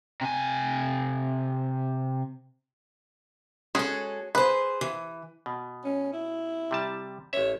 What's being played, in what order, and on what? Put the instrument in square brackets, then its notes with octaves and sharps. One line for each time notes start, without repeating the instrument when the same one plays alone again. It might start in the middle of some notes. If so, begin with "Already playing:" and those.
[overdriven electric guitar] C3 G#5
[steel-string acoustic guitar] G#3 A4 [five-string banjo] C#4 F#4 G#4
[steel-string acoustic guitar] G#4 C5 [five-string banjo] B4
[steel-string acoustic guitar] E3
[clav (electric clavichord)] B2
[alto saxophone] C#4
E4
[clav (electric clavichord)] C3 G3 A5
[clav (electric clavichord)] A1 E5 [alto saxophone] C#5